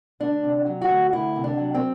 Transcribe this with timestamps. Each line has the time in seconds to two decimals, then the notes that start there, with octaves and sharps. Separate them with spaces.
0.20 D2 D4
0.43 C3
0.66 F#3
0.81 F#4
0.89 D2
1.13 D2 E4
1.36 C3
1.44 D4
1.58 F#3
1.74 C4